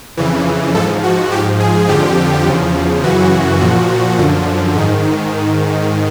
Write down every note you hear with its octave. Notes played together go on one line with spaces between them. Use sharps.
F2 C#3 E3
G#2 F3 A4
F#4
G#2 F3 G4
G#4
F2 D3 F3 G4
E2 C#3 F3
F#2 C#3 E3 F#4
A#2 F3
F#2 D3 F3
G#2 D#3